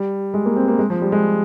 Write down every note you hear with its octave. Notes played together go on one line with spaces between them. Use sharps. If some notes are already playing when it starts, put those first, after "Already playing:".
Already playing: G3
G#3
A#3
C4
A#3
G#3
F3
G3
G#3